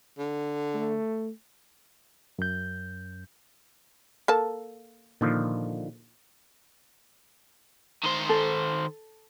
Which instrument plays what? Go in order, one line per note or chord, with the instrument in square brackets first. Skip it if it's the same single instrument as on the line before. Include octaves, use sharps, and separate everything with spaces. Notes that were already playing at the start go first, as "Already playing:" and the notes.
[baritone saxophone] D3
[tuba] A3
[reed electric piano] F#2 G6
[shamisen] A#3 A4 A5
[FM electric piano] A#2 [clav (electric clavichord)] D3 D#3 F3
[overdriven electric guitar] D#3 C5
[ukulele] A4